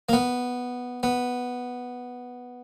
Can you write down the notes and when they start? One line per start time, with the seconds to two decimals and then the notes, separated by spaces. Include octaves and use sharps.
0.09 A#3
0.13 B3
1.03 B3